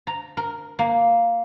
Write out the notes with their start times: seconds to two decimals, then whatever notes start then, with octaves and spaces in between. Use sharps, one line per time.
0.07 A#5
0.37 A#4
0.79 A#3